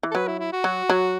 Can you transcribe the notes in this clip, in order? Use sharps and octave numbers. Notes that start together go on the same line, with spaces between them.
E3
A4
F#3 B4
E4
E4
F#4
F#3
F#3